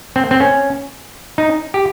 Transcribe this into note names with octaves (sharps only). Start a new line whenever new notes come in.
C4
C4
C#4
D#4
G4